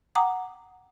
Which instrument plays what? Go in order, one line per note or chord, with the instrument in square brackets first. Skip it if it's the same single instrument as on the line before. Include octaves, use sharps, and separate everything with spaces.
[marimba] F#5 G5 A#5 D6 D#6